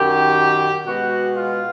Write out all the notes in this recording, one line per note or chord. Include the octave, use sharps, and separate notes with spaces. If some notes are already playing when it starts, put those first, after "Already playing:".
Already playing: F#2 D#3 F#3 G4
B2 G#3 B3 F#4
F4